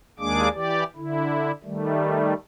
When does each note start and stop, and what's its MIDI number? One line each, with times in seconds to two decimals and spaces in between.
0.19 0.49 39
0.19 0.49 56
0.19 0.49 58
0.19 0.49 62
0.19 0.49 68
0.19 0.49 86
0.54 0.84 52
0.54 0.84 67
0.54 0.84 74
0.96 1.51 50
0.96 1.51 64
1.64 2.34 51
1.64 2.34 55
1.64 2.34 57